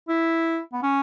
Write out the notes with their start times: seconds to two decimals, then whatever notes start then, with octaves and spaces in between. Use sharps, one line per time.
0.09 E4
0.73 B3
0.83 C#4